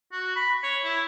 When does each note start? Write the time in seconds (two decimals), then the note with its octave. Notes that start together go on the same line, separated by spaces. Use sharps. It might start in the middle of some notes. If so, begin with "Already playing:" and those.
0.12 F#4
0.36 B5
0.63 C#5
0.84 E4